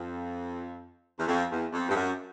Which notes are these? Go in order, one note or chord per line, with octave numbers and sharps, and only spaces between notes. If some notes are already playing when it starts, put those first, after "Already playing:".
Already playing: F2
E2
F2
E2
F2
G2
F#2